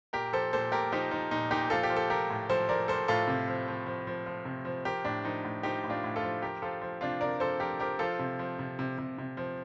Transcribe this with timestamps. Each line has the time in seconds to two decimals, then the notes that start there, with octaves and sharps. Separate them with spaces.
0.13 A#2 G4 A#4
0.33 F3 A4 C5
0.53 A#2 A4 C5
0.72 A#2 G4 A#4
0.92 F3 D#4 G4
1.11 F3 D#4
1.31 A#2 D#4
1.50 A#2 D#4 G4
1.70 F3 F4 A4
1.83 G4
1.90 F3
1.96 A4
2.09 F3 G4 A#4
2.30 A2
2.50 F3 A4 C5
2.69 F3 A#4 D5
2.88 F3 A4 C5
3.08 A2 F4 A4
3.27 C3
3.48 F3
3.68 F3
3.87 F3
4.07 F3
4.26 F3
4.45 C3
4.65 F3
4.85 F3 G4 A#4
5.05 A2 D4
5.24 F3 D#4
5.45 A2
5.63 F3 D#4 G4
5.84 A2
5.90 D4 F4
6.04 A2
6.16 F4 A4
6.23 F3
6.42 F3 G4 A#4
6.62 F3 F4 A4
6.81 F3
7.01 C3 D4 F4
7.21 C3 A#4 D5
7.40 F3 A4 C5
7.60 F3 G4 A#4
7.79 F3 G4 A#4
7.99 F3 F4 A4
8.19 C3
8.39 F3
8.59 C3
8.79 C3
8.98 C3
9.18 C3
9.37 F3